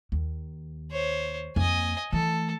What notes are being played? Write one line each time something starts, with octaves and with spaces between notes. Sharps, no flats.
D#2
C5 C#5
F2 A#3 D#5 G#5
E3 A3 A4